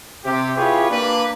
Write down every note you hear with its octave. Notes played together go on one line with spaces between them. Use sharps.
C3 G4
E4 F4 G4 G#4 B4 C#5
A#3 D4 B4